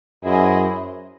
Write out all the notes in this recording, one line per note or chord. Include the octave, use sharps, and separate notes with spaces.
F#2 E4 G#4 C5 D#5